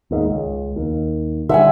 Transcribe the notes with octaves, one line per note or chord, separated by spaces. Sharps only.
D#2 G#2
C#2
D#2
D3 G3 E5 F#5 G#5